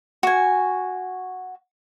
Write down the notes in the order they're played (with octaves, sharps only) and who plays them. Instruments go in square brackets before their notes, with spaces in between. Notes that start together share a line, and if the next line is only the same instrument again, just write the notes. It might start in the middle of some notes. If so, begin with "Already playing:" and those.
[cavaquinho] F#4 G#5